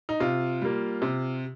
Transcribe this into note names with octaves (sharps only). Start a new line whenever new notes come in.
D#4
C3 F4
G3 A#3
C3